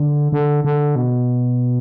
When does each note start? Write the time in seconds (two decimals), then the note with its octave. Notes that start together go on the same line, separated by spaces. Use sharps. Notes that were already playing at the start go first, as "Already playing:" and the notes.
Already playing: D3
0.32 D3
0.65 D3
0.96 B2